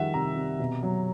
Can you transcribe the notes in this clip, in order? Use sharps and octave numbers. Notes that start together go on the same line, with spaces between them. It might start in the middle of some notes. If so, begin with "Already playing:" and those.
Already playing: D#3 F3 G3 E5 F#5
C3 A#5
C3
B2
F#3